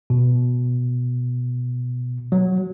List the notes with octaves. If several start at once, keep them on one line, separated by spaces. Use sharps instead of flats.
B2
F#3